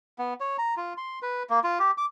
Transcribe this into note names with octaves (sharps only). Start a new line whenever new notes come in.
B3
C#5
A#5
F4
C6
B4
A#3
F4
G4
D6